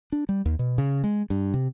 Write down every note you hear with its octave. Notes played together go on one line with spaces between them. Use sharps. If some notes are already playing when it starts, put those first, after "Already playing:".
D4
G3
D#2
B2
C#3
G#3
G2
C3